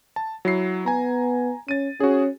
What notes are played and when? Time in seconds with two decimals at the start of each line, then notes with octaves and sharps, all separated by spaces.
0.16 A5
0.45 F#3 E4 C7
0.86 B3 G#5 A#5
1.68 C#4 A6 D#7
2.00 C#4 F#4 G#4